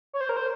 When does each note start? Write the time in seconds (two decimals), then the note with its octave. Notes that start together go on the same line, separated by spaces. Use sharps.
0.13 C#5
0.21 C5
0.29 A#4
0.37 C5